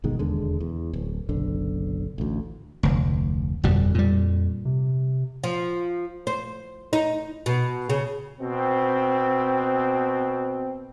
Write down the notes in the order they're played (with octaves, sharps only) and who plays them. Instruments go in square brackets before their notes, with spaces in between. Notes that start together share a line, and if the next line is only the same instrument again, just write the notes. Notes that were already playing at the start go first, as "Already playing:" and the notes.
[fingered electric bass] G1 B2 D#3 G#3
E1 D#2 D3 G#3
E2
D1
F#1 B1 D3
A1 D2
[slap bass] F1 D2
[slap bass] G1 B2 G3 [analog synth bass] F2
[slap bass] A#2 G3
[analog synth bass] C3
[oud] F3
C5
D#4
B2
C#3
[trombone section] B2 C4